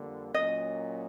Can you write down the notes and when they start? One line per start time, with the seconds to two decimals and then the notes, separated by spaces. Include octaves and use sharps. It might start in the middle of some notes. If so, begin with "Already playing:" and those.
Already playing: F2 D3 G3 A#3
0.34 A#2 F#3 A#3 C#4 D#5